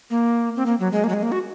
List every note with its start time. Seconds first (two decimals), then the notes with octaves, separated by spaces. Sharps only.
0.10 A#3
0.56 C4
0.66 A#3
0.80 F#3
0.92 G#3
1.04 A#3
1.09 F#3
1.13 G#3
1.23 A#3
1.32 F#4